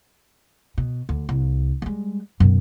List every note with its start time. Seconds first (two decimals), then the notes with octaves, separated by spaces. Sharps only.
0.78 B2
1.09 D2
1.29 C2
1.82 G3 G#3
2.40 F#2 B2